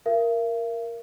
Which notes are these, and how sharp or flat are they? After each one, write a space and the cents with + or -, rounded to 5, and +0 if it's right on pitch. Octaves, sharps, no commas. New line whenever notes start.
A#4 +0 E5 +45